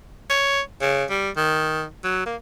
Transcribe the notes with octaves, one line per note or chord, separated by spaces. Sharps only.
C#5
C#3
G3
D#3
F#3
A#3